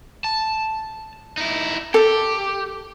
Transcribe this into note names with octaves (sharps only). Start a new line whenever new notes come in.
A5
D#4 E4
G4 A4